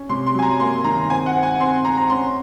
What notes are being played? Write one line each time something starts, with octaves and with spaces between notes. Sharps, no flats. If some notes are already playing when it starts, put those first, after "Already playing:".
Already playing: C#4
C3 C6
C6
F#3 G#5
A#5
A#3 C6
D#3 A#5
C4 G#5
F#5
C4
G#5
C4 C6
C4 A#5
A#5
C#4 C6